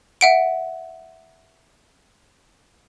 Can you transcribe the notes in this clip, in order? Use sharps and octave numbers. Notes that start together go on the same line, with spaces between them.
E5 F#5 D7